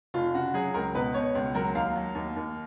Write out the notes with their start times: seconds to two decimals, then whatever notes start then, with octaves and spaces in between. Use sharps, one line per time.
0.14 F1 F4
0.34 C#3 F#4
0.54 F#3 G#4
0.74 C#2 A#4
0.95 B2 B4
1.14 B2 C#5
1.35 C#2
1.55 F#3 A#4
1.75 D#2 F5
1.96 F#3
2.15 D#2
2.36 D#2